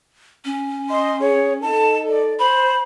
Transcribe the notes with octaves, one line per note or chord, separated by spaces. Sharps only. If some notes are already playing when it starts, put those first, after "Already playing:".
C#4
D#5 C6
G#4 C#5
D#4 A4 A5
D5
C5 B5